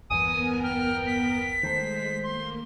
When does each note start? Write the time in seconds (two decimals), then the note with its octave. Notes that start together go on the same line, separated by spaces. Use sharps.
0.10 G1 E2 E3 B3 A#4 G#5 D#6
0.63 G5 F6
1.07 B6
1.63 D#3 G#3 A3 C5
2.23 A#3 C6